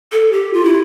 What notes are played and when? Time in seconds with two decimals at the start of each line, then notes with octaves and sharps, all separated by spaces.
0.12 A4
0.33 G4
0.53 F4
0.65 E4